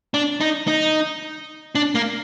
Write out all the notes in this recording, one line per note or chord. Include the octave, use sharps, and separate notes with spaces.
D4
D#4
D#4
D4
A#3